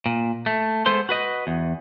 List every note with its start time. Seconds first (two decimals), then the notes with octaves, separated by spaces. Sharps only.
0.06 A#2
0.46 A3
0.86 G#3 B3 A4 C5 C6
1.09 F#4 B4 D#5
1.47 E2